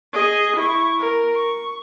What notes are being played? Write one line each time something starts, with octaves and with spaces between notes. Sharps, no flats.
G#4 D#5
E4 C#6
A#4
C#6